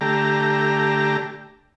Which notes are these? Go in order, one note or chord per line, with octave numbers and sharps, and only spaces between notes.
D3 A3 G4 A#5